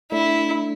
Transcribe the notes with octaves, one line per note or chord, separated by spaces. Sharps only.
A3 D4 E4